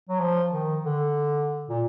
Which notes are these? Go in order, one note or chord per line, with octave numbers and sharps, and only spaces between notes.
F#3
F3
D#3
D3
A#2